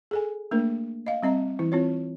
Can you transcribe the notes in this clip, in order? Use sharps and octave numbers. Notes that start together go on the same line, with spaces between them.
G#4 A4 G#5
A3 A#3 D4 A#4
D#5 F5
G3 C4 D#5 A#5
E3 E4
C4 F4 C#5